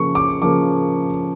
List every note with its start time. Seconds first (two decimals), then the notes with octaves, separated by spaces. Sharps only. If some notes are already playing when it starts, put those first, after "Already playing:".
Already playing: C#3 F3 A#3 C#6
0.15 D6
0.42 C#3 F3 A#3 D6